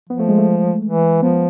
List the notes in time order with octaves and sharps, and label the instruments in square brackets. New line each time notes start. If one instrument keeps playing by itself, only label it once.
[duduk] F3 [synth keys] B3
[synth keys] A3
G#3
A3
G#3
[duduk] E3
[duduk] F3 [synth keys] B3